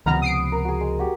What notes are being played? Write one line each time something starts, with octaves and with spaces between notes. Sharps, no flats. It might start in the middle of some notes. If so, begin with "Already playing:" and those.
C#2 C3 D#3 F3 B3 A#5 B5 F6
D#6 C7 D7
A#4
F#4 G#4
G#3
F#4 G4